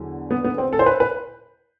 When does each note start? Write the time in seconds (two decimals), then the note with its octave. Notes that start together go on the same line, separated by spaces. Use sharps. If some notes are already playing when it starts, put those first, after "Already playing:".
Already playing: E2 D3 F#3
0.31 B3
0.44 B3
0.58 C4
0.73 A4
0.79 C5
0.86 B4
1.00 B4